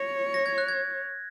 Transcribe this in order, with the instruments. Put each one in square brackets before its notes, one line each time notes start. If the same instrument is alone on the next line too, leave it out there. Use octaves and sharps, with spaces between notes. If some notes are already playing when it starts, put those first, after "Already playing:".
Already playing: [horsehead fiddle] C#5 [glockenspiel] A#6
[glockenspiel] A#6
G#6
F#6
G#6